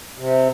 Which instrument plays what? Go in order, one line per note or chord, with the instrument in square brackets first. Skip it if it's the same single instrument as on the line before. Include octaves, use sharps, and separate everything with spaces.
[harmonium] C3